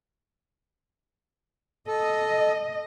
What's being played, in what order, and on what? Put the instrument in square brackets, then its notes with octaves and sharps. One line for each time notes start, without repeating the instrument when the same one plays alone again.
[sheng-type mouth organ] A4 [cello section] D#5